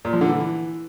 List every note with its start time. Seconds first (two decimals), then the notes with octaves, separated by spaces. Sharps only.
0.05 A#2
0.13 F3
0.21 D3
0.29 E3